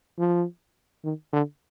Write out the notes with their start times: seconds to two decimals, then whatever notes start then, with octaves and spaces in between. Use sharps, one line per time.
0.18 F3
1.04 D#3
1.33 D3